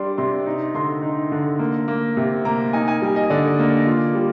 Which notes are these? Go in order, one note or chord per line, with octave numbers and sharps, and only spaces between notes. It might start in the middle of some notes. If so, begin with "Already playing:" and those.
Already playing: G3 D4 D5 C6
C3 C6
D#4
D3 C6
D#4
D3
A#3
A#3
C3
A#3 A#5
D#4 G#5
G#5
G3
D#5
D3 D5
A#3
F4
G3